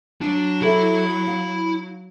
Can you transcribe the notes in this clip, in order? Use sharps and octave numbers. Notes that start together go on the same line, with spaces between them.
F#3 D4
E4 G4 A4 E5 B5
F5